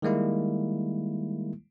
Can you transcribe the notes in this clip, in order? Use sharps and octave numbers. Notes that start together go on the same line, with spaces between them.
D#3 G3 G#3 A#3 E4